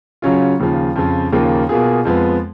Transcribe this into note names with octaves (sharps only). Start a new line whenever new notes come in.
C#3 F#3 C#4 F4
D#2 C#3 F3
F2 C#3 F3
D#2 C#3 F3 A#3 F4
B2 A#3 F4 G#4
F2 F3 G#3 B3